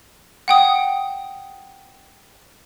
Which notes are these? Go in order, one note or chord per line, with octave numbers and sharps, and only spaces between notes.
F#5 G5 D#6